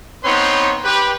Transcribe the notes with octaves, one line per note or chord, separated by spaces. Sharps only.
B3 C4 D#4 B4 C#5 C6
G4 B4